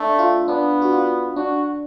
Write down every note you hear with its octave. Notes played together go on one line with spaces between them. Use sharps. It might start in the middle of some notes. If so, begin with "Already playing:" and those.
Already playing: A3 D4
F4
B3 D4
F#4
F4
D4 F#4